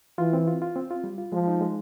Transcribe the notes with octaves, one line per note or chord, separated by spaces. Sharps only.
E3 F4
C4
F4
F4
C4
F4
G3
F4
F3 G#3
D#4
G#3